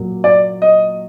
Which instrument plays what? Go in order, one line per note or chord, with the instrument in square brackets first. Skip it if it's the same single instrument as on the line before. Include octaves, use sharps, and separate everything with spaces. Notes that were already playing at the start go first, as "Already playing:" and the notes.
Already playing: [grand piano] A#2 F#3 A#3
[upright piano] D5
D#5